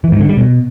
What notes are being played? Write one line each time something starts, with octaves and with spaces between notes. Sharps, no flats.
E3
G#2
D3
G3
B2